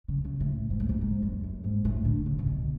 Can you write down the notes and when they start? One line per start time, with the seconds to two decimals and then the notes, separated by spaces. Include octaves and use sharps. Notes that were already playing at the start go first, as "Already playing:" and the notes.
0.08 C#3
0.24 C#3
0.40 A2
0.70 G#2
0.80 A2
0.89 G#2
1.01 G#2
1.22 F#2
1.44 F#2
1.64 G#2
1.85 A2
2.05 D3
2.26 C#3
2.39 C#3
2.46 B2